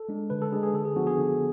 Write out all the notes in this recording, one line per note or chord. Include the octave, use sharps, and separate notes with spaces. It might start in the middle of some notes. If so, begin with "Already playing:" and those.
Already playing: A4
G#3 D4
D3 B4
A4
G#3 D4 G#4
G#4
D3 A4
G#4
F3 B3 D4 F#4
G#4
D3